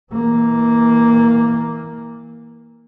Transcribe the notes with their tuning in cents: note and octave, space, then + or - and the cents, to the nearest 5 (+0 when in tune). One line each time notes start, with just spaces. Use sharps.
E3 -25 A#3 +0